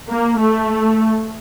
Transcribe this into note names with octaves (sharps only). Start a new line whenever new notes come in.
A#3
A3